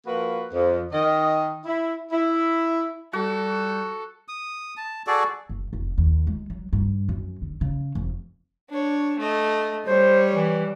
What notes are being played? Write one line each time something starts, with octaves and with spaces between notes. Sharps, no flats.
F3 A#3 F#4 B4
F2
D#3 D#5
E4
E4
G3 F#4 A4
D#6
A5
F#4 G#4 A4 D5
F#1
F1
D#2
G#3
F#3
G2
F#2
D3
C#3
F1
D4 C#5
A3 D#5
G3 C5 C#5
E3